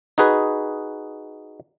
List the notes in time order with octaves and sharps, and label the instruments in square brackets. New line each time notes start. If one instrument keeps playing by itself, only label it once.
[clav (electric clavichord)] D#4 F#4 G#4 B4